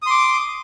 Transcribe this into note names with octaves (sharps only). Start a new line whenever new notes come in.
C6 D6 D#6